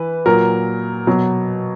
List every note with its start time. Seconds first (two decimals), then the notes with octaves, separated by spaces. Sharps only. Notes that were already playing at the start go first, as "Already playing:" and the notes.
Already playing: E3 B4
0.26 A#2 F#3 A#4
1.07 B2 F#3